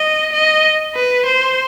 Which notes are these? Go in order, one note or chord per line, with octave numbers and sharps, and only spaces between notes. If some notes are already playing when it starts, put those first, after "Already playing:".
Already playing: D#5
D#5
B4
C5